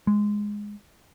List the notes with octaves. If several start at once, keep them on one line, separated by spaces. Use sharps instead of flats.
G#3